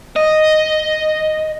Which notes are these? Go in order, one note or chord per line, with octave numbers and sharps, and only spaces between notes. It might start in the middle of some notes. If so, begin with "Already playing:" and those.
D#5